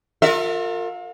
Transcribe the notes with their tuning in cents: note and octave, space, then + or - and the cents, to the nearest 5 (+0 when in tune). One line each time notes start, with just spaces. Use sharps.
F4 +35 A#4 -35 E5 +0